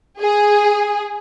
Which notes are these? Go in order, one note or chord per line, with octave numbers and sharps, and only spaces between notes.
G#4